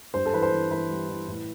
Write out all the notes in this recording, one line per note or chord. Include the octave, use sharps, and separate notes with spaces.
G2 C5
A4
E3 B4
C5
E3
E3 B4
G3
E3
A2